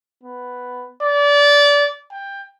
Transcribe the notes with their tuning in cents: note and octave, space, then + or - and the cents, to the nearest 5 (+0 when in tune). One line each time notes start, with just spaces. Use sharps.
B3 +5
D5 -25
G5 +15